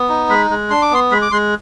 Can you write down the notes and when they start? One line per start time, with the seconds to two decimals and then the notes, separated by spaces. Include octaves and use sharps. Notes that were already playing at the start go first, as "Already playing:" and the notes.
Already playing: B3
0.09 D#4
0.29 G#3 B5
0.50 G#3
0.70 D4 C6
0.82 D6
0.91 B3 C6
1.11 G#3 B5
1.22 D6
1.31 G#3 C6